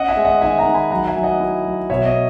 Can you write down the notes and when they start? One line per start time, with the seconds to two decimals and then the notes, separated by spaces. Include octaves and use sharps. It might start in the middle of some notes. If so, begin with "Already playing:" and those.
Already playing: C#4 D#5 F#5
0.08 E5 G#5
0.17 G#3
0.25 D#5 F#5
0.41 D#3 E5 G#5
0.58 F#5 A#5
0.66 D#3
0.74 G#5 B5
0.91 F#3 F#5 A#5
1.07 E5 G#5
1.15 F#3
1.23 D#5 F#5
1.40 E4
1.65 F#3
1.90 B2 C#5 E5
2.06 D#5